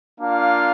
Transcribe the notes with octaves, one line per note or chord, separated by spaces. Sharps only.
A#3 D4 F4 F5